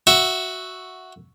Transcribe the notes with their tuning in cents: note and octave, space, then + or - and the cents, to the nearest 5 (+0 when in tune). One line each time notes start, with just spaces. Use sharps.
F#4 +0 E5 +0